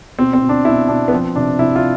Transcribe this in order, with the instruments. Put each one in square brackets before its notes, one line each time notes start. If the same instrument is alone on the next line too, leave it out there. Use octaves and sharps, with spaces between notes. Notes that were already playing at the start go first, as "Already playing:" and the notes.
[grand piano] B2 C4
C4
B2
D4
B2 E4
B2 D4
B3
F3 C4
C3 D4
C3 E4
F4